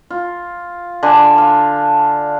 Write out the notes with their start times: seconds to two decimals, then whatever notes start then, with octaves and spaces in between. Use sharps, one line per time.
0.10 F4
1.03 D3 D4 G#5 C6
1.38 F5